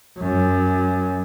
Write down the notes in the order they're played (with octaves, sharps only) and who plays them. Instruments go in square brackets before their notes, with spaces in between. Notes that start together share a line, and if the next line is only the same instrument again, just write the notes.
[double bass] F#2